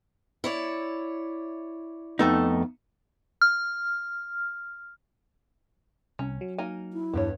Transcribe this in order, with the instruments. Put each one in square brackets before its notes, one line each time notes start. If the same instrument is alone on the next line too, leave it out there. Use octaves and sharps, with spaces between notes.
[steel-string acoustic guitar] E4 C#5 D5
[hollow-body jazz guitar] F2 A3 D#4 [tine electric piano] B3
[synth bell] F6
[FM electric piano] C2 [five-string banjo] C#4
[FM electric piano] F#3
[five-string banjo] A#3 D#4 G#5
[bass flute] E4
[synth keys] E2 G2 [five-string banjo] B3 C#5